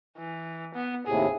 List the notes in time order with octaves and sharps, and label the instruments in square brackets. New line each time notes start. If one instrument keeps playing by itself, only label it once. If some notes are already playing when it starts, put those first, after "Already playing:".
[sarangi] E3
B3
[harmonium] D#2 A2 C3 [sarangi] G#4